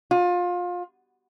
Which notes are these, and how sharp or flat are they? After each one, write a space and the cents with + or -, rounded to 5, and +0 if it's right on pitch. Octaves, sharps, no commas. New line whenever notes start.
F4 +25